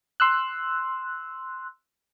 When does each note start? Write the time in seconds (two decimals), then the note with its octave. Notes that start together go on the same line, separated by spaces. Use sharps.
0.20 C6 E6 F#6